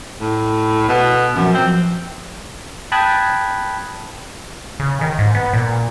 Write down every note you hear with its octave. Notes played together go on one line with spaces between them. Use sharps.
A2
B2
F#2 A#2 F3 F#3
C4
G5 A5 B5 D#6 F#6 G#6
C#3
D#3
G#2
B3
A#2